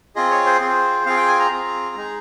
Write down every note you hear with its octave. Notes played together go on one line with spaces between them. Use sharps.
C4 F4 G#4 D#5
C#5
C5
C4 F4 G#4
C4 F4 G#4 F5
G5
G#5
A#5
C4 F4 G#4
G#3 D#4 G#4